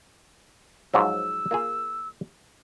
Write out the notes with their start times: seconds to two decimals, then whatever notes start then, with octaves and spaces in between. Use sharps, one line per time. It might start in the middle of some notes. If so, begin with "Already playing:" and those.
0.94 G#2 F3 F#3 E6
1.51 A#3 F4 G#4